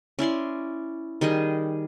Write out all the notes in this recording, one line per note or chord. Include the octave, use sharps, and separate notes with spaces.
C#4 E4 D5 C6
D#3 G3 G#4 D#5